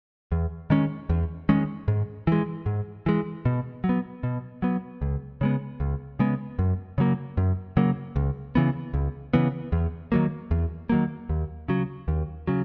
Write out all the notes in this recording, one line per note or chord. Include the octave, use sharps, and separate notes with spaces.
E2
D#3 G#3 C#4
E2
D#3 G#3 C#4
G#2
E3 G#3
G#2
E3 G#3
B2
F#3
B3
B2
F#3 B3
C#2
C#3 G#3 B3
C#2
C#3 G#3 B3
F#2
C#3 F#3 A#3
F#2
C#3 F#3 A#3
C#2
C#3 E3 B3
C#2
C#3 E3 B3
E2
D#3 F#3 A#3
E2
D#3 F#3 A#3
D#2
C#3 F#3
D#2
C#3 F#3